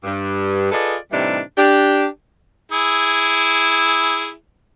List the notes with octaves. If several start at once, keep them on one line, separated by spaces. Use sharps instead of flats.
G2
F4 G#4 A4 B4 D5 D#5
A2 C3 E3 G3 D4 D#4
D4 G4
E4 G#4